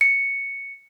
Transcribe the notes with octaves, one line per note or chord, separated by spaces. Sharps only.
C#7